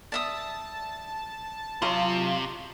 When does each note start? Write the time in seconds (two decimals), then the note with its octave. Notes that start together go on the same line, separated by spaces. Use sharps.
0.12 D5 E5 A5 D#6
1.82 C3 F#3 F4 D#5 C6 C#6